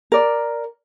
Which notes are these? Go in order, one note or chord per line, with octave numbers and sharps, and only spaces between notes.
A#4 D5